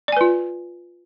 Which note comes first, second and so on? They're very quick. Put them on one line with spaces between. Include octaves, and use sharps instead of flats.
D5 G#5 B4 F4